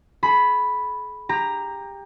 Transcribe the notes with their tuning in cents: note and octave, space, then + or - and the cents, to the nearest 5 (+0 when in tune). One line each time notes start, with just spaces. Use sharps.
G#4 +45 B5 +0
G4 +25 A#5 +0